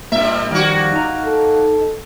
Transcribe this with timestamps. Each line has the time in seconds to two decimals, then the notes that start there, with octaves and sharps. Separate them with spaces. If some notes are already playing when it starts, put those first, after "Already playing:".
0.12 G2 A#2 A#3 E5
0.51 D#3 F3 G3 A#3 F#4
0.92 D#4 A#5
1.25 A4